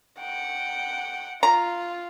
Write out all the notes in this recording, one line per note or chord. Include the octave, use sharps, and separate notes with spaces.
F#5 G5
F4 A#5